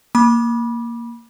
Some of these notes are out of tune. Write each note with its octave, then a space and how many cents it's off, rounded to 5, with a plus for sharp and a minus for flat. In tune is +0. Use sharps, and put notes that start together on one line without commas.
A#3 +0 B5 -25 D6 +10